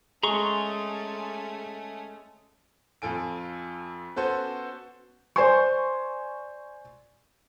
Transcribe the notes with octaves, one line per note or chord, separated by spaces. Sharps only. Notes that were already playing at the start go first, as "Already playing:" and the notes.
G#3 A3 C#4 G#4 A#5 C6 C#6
F2 F4 A4 G#5 D7
B3 C#4 F#4 A4 C5
C5 D5 G#5 C6 C#6